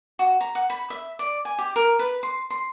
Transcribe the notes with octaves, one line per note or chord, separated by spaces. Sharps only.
F#4
A#5
F#5
B5
E5
D5
G#5
G4
A#4
B4
C6
C6